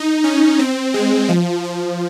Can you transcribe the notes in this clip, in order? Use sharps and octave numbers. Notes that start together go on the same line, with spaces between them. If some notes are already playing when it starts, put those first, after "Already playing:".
Already playing: D#4
C#4
C4
G#3
F3
F3